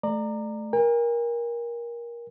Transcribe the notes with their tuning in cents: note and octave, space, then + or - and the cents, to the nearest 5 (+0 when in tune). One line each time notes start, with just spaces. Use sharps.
A3 -15 D5 +25 A#5 -15
A#4 +20 G#5 -45